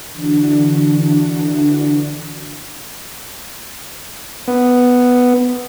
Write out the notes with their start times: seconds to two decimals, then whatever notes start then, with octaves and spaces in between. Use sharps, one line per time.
0.11 D3 E3 D4 F#4
4.48 B3